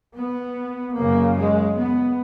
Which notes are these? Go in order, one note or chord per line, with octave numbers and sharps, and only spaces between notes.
B3
F#2 C#3 A#3
G#3
B3